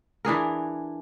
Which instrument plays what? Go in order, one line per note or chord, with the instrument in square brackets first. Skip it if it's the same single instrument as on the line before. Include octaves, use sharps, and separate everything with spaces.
[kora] E3 D4 G#4 A#4